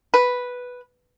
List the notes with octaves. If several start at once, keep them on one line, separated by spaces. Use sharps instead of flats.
B4